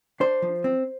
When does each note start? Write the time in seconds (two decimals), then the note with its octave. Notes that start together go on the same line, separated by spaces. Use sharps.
0.20 D4 C5
0.42 F3
0.64 C4